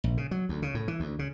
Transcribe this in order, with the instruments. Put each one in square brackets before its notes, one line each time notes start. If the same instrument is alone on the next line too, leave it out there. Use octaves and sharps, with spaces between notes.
[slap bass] A#1
C#3
F#3
D2
C#3
A2
E3
D2
C#3